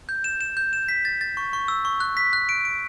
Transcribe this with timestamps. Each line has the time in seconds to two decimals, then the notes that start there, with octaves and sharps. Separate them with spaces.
0.09 G6
0.24 E7
0.41 E7
0.57 G6
0.73 E7
0.88 B6
1.05 A6
1.21 A6
1.37 C#6
1.53 C#6
1.68 E6
1.85 C#6
2.00 F#6
2.17 B6
2.33 F#6
2.49 D7
2.65 D7